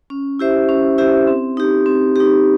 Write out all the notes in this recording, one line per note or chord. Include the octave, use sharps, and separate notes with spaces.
C#4
E4 G4 C5 E5
C#4
E4 G4 C5 E5
C4
D#4 G4
C4
D#4 G4